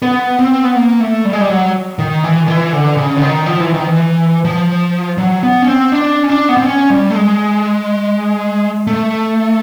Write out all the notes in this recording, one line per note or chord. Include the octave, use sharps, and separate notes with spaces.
B3
C4
B3
A#3
A3
G3
G#3
G3
F#3
D#3
E3
D#3
E3
D3
C#3
D3
D#3
F3
E3
D#3
E3
F3
F#3
B3
C#4
C4
D4
C#4
D4
B3
C4
C#4
G3
A3
G#3
A3